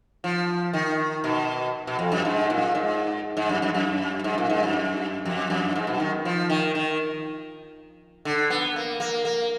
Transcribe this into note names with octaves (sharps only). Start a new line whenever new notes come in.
F3
D#3
B2
B2
F2
F#2
G#2
A#2
G#2
G#2
F#2
F#2
F#2
G#2
A#2
G#2
F#2
F2
F#2
G#2
B2
D#3
F3
D#3
D#3
D3
B3
A#3
A#3
A#3